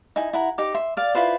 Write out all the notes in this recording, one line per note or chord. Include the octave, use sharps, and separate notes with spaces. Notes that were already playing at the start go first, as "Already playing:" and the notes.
D#4 E4 G#5
E4 F#5 A#5
D#4 G4 D6
E5 C6
D5 F5
E4 F4 B4 C5